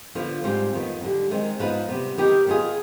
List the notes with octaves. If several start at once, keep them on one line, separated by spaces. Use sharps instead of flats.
D3 F3 B3 F4
G#2 G3 C4 F4 C5
F2 D#3 B3
D#2 D3 G3
D#3 G#3 C4
G#2 F3 B3 D#4 B4
C3 G3 B3
D#3 B3 D#4 G4
D#3 B3 F4 G#4